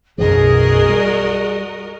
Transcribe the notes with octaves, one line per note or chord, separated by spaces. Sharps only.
B1 F#2 E3 F#4 G#4 A#4 D#5
G3